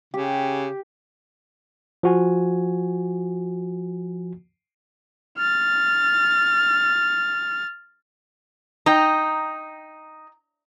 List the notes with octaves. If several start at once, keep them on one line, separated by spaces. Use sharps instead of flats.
C#3 G4
F3 F#4 G#5
F6 A6
D#4 G5 A#5